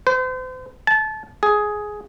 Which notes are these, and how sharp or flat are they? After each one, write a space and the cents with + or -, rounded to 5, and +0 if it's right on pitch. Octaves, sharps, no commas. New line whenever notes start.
C5 -40
A5 -25
G#4 +10